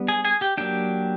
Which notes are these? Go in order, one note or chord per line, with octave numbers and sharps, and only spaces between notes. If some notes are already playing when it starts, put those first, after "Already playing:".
Already playing: G3 B3 D4
G#4 G#5
G#4 G#5
G4 G5
F#3 A#3 D4 G4 G5